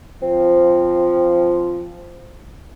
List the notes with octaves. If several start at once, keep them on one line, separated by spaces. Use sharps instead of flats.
F3 C4